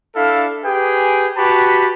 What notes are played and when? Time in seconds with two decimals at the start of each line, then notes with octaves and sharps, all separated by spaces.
0.15 D4 E4 A4 F5
0.64 G4 G#4 B4 G5 G#5
1.37 F#4 G4 B4 A5 B5